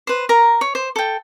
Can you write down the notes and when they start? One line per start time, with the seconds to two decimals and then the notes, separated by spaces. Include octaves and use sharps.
0.07 B4 C5
0.29 A#4 A#5
0.61 C#5
0.75 C5
0.96 A4 G5